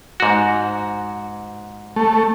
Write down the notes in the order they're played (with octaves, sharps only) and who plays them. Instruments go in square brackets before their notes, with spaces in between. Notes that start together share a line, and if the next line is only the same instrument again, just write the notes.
[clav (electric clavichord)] G#2 F#4
[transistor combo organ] A3